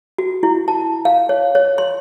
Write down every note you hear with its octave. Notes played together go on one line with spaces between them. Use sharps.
F#4
E4
A5
F5
C#5
C#5
C6